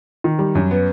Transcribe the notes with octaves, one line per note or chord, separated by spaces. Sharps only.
D#3
G3
F#2
B3